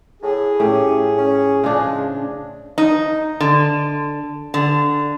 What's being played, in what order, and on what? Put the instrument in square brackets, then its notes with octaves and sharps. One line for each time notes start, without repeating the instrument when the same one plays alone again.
[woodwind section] A2 [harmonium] G#4
[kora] A2 [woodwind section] C#4 G4
[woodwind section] C#4
[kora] C#3 D4 [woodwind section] F3 G#3
[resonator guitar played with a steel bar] D#4
D3
D3